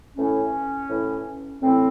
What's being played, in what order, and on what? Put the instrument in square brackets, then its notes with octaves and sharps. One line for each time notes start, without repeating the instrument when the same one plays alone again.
[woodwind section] A2 E3 C#4
A2 E3
A2 E3 C4